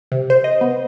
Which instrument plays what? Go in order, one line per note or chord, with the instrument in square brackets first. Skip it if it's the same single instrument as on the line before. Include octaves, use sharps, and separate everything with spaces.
[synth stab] C3
C5
D#5
B3